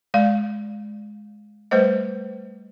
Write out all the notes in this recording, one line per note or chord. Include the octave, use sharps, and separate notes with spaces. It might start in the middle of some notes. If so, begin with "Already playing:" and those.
G#3 D5 F5
G3 A3 B4 C5 D#5